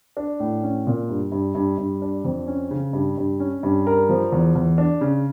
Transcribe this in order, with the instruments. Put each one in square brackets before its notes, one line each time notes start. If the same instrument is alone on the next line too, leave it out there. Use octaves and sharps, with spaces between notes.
[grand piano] D4
A2
C#4
A#2
G2
G2
G2
G2
D4
F2
C#4
C#3
G2
G2
C#4
G2
A#4
F3
E2
E2
D4
C#3